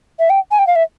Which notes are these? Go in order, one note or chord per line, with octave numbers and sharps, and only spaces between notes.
E5
G5
G#5
G5
F5
E5